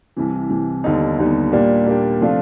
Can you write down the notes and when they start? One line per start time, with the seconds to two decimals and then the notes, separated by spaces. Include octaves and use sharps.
0.16 C2 C3 E3
0.50 C2 C3 E3
0.84 D#2 D3 G3 B3 D#4
1.18 D#2 D3 G3 B3 D#4
1.52 A#2 G3 A#3 D4 G4
1.86 A#2 G3 A#3 D4 G4
2.21 C3 F3 A3 D4 F4